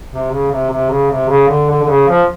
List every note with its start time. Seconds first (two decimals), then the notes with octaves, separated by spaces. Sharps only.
0.12 C3
0.31 C#3
0.51 C3
0.71 C3
0.91 C#3
1.10 C3
1.29 C#3
1.48 D3
1.69 D3
1.83 D3
1.88 C#3
2.08 F3